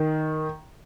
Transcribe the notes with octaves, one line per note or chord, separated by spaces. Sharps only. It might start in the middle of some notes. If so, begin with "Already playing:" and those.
Already playing: D#3